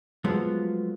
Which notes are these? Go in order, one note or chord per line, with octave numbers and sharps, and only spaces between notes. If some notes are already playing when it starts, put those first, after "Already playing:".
F3 F#3 G#3 A3 B3 F4